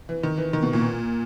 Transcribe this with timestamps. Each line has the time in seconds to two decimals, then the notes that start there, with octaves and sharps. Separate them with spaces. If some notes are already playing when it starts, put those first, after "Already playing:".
0.09 E3
0.23 D#3
0.37 E3
0.53 D#3
0.63 B2
0.73 A#2